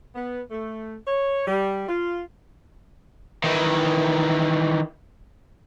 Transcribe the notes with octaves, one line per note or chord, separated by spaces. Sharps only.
B3
A3
C#5
G3
F4
D#3 E3